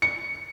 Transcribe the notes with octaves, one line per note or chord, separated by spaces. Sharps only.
C#7